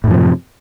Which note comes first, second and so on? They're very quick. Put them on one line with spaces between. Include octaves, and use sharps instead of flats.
A2 F#2 F3 C3